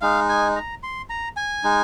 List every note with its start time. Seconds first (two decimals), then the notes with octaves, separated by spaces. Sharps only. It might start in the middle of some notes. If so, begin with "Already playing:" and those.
0.01 G#3 D#4 F5
0.29 G#5
0.56 A#5
0.83 C6
1.10 A#5
1.37 G#5
1.64 G#3 D#4